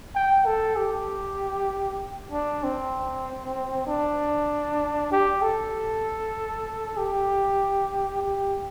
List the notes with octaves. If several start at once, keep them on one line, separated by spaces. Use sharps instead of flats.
G5
A4
G4
D4
C4
D4
G4
A4
G4
G4